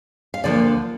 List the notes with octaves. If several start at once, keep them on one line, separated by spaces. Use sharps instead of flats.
F5
D2 D3 F3 A#3 D5